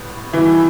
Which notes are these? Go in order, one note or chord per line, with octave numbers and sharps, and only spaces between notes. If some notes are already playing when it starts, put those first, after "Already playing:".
Already playing: A2 G3 B3
B2 E3 G3 B3 E4